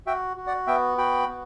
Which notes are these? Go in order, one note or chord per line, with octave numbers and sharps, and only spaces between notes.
F#4 E5 G5
F#4
D5 F#5
B3 E5 G5
F#4 G5 B5
B3